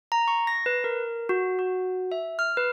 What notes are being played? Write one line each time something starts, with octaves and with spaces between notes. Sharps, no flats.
A#5
C#6
A#6
B4
A#4
F#4
F#4
E5
F6
B4